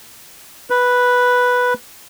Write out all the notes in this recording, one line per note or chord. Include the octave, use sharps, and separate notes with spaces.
B4